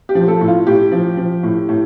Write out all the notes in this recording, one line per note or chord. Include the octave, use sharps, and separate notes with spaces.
G4
F3
A4
A2
F4
A2 G4
F3
F3
A2
A2